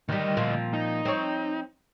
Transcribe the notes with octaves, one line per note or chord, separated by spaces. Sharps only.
D2 D#3 G3 D#5
A#2 F3 C4
D#4
C4 C#5